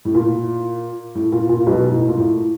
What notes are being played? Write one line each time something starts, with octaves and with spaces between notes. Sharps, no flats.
A2
A#2
A2
A#2
A#2
B1 B2
A2
A#2
A2